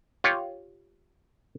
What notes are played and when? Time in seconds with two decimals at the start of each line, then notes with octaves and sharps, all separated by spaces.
0.24 F4 G4 C#5